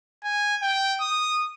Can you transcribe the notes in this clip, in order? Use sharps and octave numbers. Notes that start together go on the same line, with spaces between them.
G#5
G5
D#6